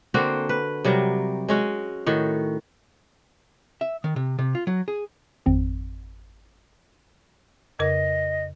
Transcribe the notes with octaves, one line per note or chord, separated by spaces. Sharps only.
D3 A#3 C4 F#4
B4
C3 F#3 G3 A#4
G#3 C#4 F#4
A2 D#3 F#4
E5
D#3
C3
C3
F4
F#3
G#4
G#1 F2 C4
F2 C#3 A#4 D#5